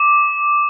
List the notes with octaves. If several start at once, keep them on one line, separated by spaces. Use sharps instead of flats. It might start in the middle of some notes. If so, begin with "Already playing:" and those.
Already playing: D6